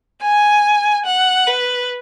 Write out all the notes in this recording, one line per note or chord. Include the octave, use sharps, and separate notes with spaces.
G#5
F#5
B4